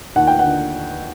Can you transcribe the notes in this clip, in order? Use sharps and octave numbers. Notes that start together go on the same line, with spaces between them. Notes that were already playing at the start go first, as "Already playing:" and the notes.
D#2 F#5
G5
D3 F#5